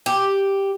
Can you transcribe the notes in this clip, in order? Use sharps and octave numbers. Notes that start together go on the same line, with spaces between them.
G4